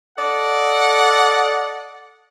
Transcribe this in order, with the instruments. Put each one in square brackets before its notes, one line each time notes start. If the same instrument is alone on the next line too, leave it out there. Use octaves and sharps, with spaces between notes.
[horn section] A4 D5 D#5 F#5